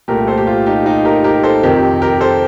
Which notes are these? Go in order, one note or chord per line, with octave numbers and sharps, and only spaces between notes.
C2 A#2 A3 G4 A#4
A4 C5
G4
F4
D#4 G4
D#4 G4
G4 A#4
G4 A#4
A4 C5
F2 C3 D#3 G4 A#4
G4 A#4
A4 C5